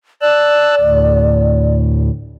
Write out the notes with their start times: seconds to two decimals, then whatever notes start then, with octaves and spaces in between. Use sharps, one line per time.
0.22 D5 A5 E6 F#6
0.81 D2 A2